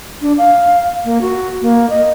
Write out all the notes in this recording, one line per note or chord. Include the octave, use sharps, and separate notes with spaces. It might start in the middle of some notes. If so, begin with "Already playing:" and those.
D4
F5
A#3
F#4
A#3
D#5